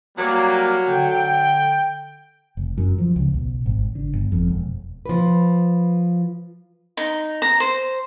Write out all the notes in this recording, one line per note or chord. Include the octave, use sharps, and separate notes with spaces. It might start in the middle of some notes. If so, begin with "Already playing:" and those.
F#3 G3 A#3
D3 G5
F1
F#2
F3
C#2
B1
G#1
D3
G1
F2
E1
F3 B4
D#4
A#5
C5